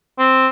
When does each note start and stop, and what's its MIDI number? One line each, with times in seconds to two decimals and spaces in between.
0.19 0.47 60